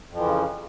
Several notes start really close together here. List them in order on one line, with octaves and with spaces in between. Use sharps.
F2 F3 E3 C#3